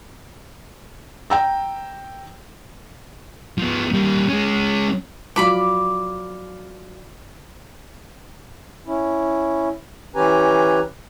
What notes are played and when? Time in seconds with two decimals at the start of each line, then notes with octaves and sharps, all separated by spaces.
1.30 G5 A#5 E6
3.58 F3 B3
3.93 G3 A#3
4.28 G#3 C#4
5.36 F3 F#3 F4 D5 B5 D6
8.87 C#4 E4
10.16 E3 C#4 G4 B4 G#5 A#5